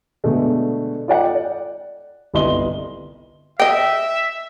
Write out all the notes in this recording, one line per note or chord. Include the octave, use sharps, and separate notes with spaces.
B2 D3 G#3 A3
F4 A4 D5 D#5 F#5 G5
D5
G1 C2 D#5 C6 G7
D#5 E5 G5